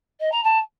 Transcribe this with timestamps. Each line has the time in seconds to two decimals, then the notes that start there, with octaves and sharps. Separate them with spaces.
0.20 D#5
0.32 A#5
0.43 A5